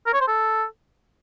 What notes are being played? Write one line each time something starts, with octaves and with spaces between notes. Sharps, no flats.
A#4
C#5
C5
A4